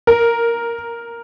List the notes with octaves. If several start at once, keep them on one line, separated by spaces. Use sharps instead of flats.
A#4